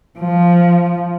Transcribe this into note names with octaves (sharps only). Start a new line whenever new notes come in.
F3